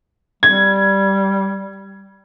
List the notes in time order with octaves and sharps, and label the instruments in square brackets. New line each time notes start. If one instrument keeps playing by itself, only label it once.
[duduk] G3 [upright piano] G#6